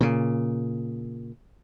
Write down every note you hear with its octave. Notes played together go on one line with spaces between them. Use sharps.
A#2 C#3